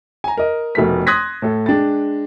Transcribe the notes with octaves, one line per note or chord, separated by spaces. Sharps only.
G#5 A#5
A#4 D#5
F1 B2 A3 A#4 B6
C6 D#6 F#6 G#6 A#6 B6
A2 A4
G#3 D4 G5 A6